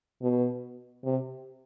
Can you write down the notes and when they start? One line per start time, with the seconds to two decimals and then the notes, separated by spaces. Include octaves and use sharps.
0.22 B2
1.04 C3